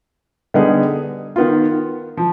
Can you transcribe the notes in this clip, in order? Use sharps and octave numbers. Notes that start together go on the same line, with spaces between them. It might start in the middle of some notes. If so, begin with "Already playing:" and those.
D3 G3 B3 D#4 G#4
D#3 B3 F4
F3